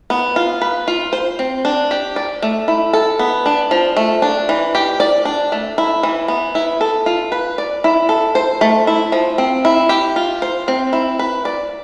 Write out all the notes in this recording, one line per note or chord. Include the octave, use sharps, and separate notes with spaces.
B3
F4
B4
F4
C5
C4
D4
G4
D5
A3
E4
A4
B3
D4
F3
A3
D4
E3
G4
D5
D4
A3
E4
E3
B3
E4
A4
F4
B4
D5
E4
A4
C5
A3
E4
F3
C4
E4
G4
F4
C5
C4
E4
B4
D5